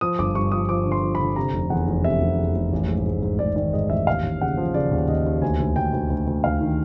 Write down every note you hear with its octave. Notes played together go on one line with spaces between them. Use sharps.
F3 D#6
G1 D6
G2 C#6
F3 D#6
F3 D6
D3
C6
F3
B5
D3
C3 A#5
F1
E2 F#5
F1
C3 E5
F1
E2
F1
A1
G#2
G#2
G#2
G#2 D5
D#3 D5
G#2 D#5
A1 E5
D#2 F5
D#2
C#3 F#5
F3
C#3 D5
D#2
D#2 D#5
D#2
D2 G#5
D2
D2 G5
D2
D2
D2
D2 F5
D#3